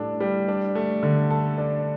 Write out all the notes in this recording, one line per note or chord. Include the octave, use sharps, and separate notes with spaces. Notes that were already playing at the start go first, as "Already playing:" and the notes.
Already playing: A2 G3 D4 A4
G3
D4
A3
D3
A4
D4